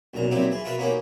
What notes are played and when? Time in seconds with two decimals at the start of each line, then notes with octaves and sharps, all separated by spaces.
0.14 B1 F#2 A#2 A#5
0.31 A#2 F#3 C4 D#4 E4 G4
0.51 E3 G#4
0.64 F4 F#4 A#4 B4 D#5 E5
0.78 A#3 B3 C#4 D#4 F#4 G4